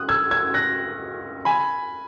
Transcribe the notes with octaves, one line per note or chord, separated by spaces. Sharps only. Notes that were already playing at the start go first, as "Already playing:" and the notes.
Already playing: D#6 F#6
E6 G#6
E6 G#6
F#6 A#6
G#5 B5